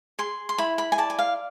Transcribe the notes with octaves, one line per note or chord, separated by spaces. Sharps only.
G#4 C6
C6
E4 B5
B5
G#5
D5 A5
G#5
F5